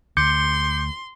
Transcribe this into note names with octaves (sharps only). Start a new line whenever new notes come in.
D2 C6 D6 G6 C#7